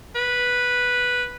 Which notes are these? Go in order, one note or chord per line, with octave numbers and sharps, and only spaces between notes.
B4